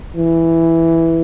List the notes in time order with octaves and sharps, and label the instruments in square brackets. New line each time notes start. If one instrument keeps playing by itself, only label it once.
[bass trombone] E3